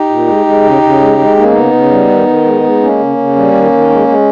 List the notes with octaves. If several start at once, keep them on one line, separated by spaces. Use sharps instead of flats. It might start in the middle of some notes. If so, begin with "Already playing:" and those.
Already playing: D#4 G4
A#2
G#3
G#3
C#3
C#3
G#3
G#3
A#3 D#4
C#4
C#3 B3 D#4
C#3
G3
D#3
D#3
G#3
G#3
A#3 C#4
C#3
C#3
G3
D#3
D#3
G#3
G#3